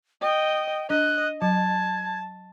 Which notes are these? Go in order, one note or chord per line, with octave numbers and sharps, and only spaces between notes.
D#5 G5
D4 D#5 F#6
F#3 A5 G#6